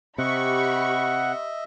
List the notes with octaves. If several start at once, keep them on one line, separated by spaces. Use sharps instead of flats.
C3 G4 D#5 E5 F#5 B5 C#6